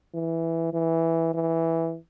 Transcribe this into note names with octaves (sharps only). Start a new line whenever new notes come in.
E3
E3
E3